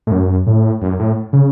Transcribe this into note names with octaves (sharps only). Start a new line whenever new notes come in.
A2
F#2
A2
F#2
A2
C#3